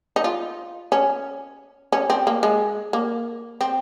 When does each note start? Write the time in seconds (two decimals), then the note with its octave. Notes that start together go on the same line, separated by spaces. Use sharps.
0.16 D#4
0.24 F4
0.92 C#4
1.92 C#4
2.10 C4
2.27 A#3
2.43 G#3
2.93 A#3
3.61 C4